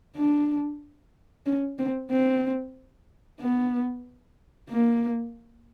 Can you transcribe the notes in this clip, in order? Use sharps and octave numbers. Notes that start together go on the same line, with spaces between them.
D4
C#4
C4
C4
B3
A#3